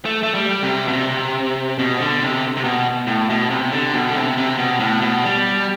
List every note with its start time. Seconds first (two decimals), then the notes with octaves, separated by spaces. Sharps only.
0.05 A3
0.23 A3
0.35 G3
0.63 C3
0.88 B2
0.92 C3
1.79 B2
2.00 D3
2.22 C3
2.57 C3
2.64 B2
3.07 A2
3.30 B2
3.50 C3
3.72 D3
3.94 B2
4.11 D3
4.15 C3
4.38 C3
4.58 B2
4.80 A2
5.01 B2
5.23 G3